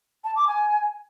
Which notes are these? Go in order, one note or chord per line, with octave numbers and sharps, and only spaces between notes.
A5
D6
G#5